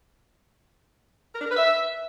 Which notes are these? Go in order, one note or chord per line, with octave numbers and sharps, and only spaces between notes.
A#4
D4
A#4
B4
E5